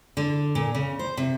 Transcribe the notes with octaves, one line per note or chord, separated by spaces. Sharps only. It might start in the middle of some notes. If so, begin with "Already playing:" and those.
D3
A#2
C#3
C5
C3